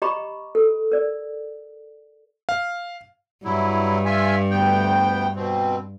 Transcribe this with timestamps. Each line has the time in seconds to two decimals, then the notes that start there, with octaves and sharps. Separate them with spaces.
0.02 G4 D#5 A#5 B5 C#6 D6
0.55 A4
0.92 A#4 D5
2.49 F5
3.45 G2 F#3 E4
4.05 F4 E5 G#5
4.51 D2 B3 G5
5.36 B2 C4